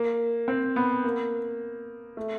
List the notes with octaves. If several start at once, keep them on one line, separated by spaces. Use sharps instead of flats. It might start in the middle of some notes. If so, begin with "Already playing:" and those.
Already playing: A#3
C4
B3
A#3
A3